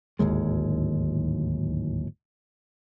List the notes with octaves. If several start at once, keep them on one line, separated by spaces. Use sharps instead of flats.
D1 G#1 D#2 G#3